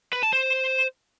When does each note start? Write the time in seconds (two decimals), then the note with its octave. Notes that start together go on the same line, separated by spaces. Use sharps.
0.13 B4
0.23 A5
0.33 C5